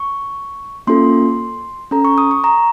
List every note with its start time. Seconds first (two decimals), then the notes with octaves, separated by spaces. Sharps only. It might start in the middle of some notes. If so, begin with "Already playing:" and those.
Already playing: C#6
0.87 A#3 C#4 F4 A4 C6
1.91 C#4 A4 A#5
2.05 C#6
2.18 D#6
2.31 C#6
2.44 A#5